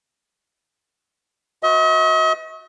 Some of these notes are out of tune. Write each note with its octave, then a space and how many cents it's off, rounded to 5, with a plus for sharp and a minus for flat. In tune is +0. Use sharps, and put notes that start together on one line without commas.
F#4 -25 B4 +45 D#5 +45